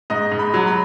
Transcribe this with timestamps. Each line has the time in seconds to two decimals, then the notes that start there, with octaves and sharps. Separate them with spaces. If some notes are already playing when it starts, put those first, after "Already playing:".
0.10 G#2 D#5
0.32 G#2
0.39 B5
0.54 F#3
0.67 B5